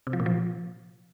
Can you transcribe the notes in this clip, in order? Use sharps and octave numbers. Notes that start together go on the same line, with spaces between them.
C3
F3
A#2
F3